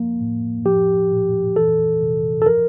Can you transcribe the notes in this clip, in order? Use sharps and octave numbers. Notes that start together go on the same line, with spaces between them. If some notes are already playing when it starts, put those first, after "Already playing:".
Already playing: F3 A#3
A2
F3 G4
A#2
E3 A4
C3
A4
F3 A#4